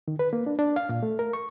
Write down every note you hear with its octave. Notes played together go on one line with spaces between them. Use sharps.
D#3
B4
A#3
D4
D4
F5
A#2
A3
A#4
C#6